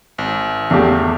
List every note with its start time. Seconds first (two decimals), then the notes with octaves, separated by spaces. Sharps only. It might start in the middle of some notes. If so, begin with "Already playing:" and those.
0.18 G#1
0.71 E2 A3 G4